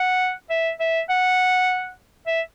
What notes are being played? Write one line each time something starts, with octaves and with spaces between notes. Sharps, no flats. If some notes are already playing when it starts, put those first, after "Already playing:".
Already playing: F#5
E5
E5
F#5
E5